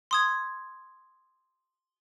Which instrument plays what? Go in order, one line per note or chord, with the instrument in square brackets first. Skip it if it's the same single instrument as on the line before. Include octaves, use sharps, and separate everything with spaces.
[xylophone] C6 D#6 G#6